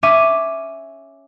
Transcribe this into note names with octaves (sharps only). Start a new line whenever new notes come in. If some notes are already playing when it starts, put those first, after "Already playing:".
C#4 E5 D6 D#7 E7